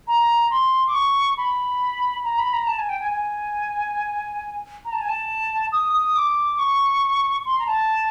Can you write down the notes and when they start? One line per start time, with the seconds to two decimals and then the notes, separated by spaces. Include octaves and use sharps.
0.07 A#5
0.51 C6
0.87 D6
0.94 C#6
1.37 B5
2.24 A#5
2.38 B5
2.53 A#5
2.67 A5
2.78 G#5
2.89 G5
3.00 G#5
3.11 G#5
4.85 A#5
4.93 A5
5.00 G#5
5.08 A5
5.72 D#6
5.93 D#6
6.16 D6
6.58 C#6
7.45 C6
7.59 A#5
7.67 A5